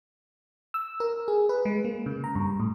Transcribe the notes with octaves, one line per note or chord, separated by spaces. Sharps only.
E6
A#4
G#4
B4
G#3
A#3
C#3
A#5
G2
A2